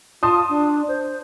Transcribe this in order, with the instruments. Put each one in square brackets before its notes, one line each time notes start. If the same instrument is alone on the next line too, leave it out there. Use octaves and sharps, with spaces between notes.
[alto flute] F4 [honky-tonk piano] A5 C6 D#6
[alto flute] D4
C5